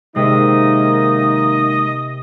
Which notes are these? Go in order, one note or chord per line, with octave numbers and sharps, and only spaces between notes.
C3 D#3 G#3 A#3 D#4 D#5 E5